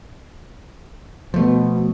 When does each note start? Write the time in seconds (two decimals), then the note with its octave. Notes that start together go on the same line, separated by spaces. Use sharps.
1.34 B2 F3 A3